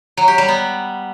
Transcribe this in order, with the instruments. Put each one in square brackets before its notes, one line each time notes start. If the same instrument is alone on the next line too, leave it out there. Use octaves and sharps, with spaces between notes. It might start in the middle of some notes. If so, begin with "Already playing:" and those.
[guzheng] F#3
G4
G3
B3